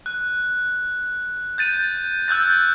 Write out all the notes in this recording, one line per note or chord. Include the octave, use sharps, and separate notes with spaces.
F#6
G6 A6 D#7
E6 F#6 G6 A6